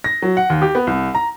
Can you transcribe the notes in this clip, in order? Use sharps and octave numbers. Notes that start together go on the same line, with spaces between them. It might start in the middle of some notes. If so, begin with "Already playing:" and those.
A#6
F#3
F#5
D#2
G4
B3
C2
A#5